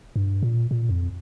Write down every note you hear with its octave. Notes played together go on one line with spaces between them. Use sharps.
G2
A#2
A#2
F2